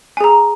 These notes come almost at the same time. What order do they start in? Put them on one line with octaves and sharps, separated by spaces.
G#5 G#4 A#5